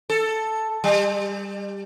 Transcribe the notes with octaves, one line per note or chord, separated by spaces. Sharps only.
A4
G3